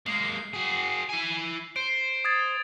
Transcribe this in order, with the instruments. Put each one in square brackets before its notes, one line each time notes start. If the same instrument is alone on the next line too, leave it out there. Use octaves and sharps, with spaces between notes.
[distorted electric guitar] G#3 A#3 [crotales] C7
[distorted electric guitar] F#4 G#4
E4 G#5
[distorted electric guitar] C5 [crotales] D7
[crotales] D#6 G#6 A6